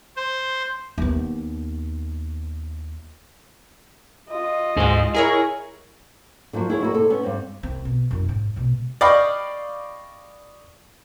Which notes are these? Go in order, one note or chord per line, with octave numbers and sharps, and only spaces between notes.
C5
D#2 B3
F4 D#5
D2 G#2 G#3 G#4
E4 G#4 A#4 C#5
D3 F3 F#3 A#3
E4 G#4 A#4 C#5
A#3 E4 F#4
C3 A4
B3 C#4
G2 C4
C2 C4
B2
F#2 E4
G#2
B2 G#3
D5 D#5 F5 G5 B5 C#6